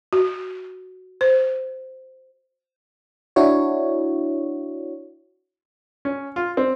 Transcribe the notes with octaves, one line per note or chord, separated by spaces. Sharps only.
F#4
C5
D4 E4 F#4 C#5
C#4
F4
C4